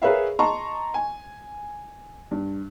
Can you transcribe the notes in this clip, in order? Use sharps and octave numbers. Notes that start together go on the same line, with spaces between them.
G#4 A#4 B4 C#5 E5 F5
D#5 A5 A#5 C6 C#6
G#5
G2